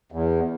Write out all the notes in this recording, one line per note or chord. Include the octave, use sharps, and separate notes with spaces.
E2